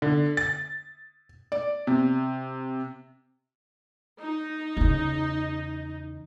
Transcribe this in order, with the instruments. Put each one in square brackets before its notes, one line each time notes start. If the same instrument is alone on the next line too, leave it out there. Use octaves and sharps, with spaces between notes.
[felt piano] D3
A6
D5
C3
[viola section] D#4
[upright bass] E2 C#3